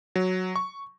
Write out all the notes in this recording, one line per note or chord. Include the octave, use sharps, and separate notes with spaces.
F#3
C#6